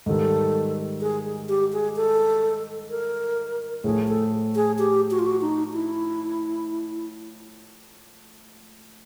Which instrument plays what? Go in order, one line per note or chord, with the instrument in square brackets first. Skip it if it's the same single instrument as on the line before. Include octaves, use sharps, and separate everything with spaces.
[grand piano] G#2 D#3 G3 [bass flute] A4
[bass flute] G#4
G4
G#4
A4
A#4
[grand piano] A2 F3 A3 [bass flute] G#4
[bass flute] A4
G#4
G4
F#4
F4
F#4
D#4
E4